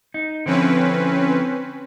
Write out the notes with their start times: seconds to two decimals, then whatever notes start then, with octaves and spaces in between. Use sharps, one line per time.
0.14 D#4
0.46 D3 F3 C4 C#4 E4 B4